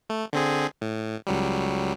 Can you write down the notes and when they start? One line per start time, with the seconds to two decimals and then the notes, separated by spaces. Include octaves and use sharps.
0.10 A3
0.33 D3 C4 G#4
0.81 A2
1.27 C#2 F#3 G3